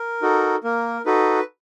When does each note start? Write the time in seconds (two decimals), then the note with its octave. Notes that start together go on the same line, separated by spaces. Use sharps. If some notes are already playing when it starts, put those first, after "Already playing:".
Already playing: A#4
0.22 D#4 F#4 A4
0.64 A#3 A#4
1.06 D#4 F#4 A4 B4